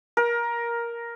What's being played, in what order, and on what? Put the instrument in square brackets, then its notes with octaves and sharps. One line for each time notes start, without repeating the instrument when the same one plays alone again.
[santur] A#4